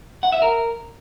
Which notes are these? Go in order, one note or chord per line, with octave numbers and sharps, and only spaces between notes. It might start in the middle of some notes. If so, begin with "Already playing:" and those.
F#5
E5
A#4